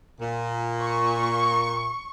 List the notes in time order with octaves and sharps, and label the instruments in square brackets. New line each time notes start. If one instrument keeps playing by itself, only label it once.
[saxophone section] A#2
[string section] C#6